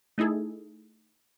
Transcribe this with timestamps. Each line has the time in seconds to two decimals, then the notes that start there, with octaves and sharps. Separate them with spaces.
0.18 A3 D#4 E4 G#4 A4